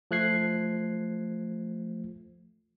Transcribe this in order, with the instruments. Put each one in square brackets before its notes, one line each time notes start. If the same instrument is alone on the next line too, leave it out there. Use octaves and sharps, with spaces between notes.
[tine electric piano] F3 A3 F#6 G#6 C7